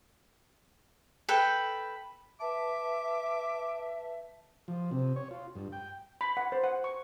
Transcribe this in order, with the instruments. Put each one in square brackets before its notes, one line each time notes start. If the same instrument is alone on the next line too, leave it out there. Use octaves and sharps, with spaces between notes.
[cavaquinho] A4 B4 G5
[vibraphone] B4 A5 [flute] E5 [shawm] D6
[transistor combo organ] F3
C3
C#5
F4
G2
G5
[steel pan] B5
F#5
C5
F#5
C#6